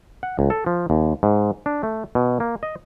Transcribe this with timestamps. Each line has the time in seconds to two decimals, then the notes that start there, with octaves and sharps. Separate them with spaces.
0.23 F#5
0.39 C#2
0.50 A4
0.66 F3
0.90 D#2
1.23 G#2
1.66 D4
1.83 A3
2.15 B2
2.40 A#3
2.63 D#5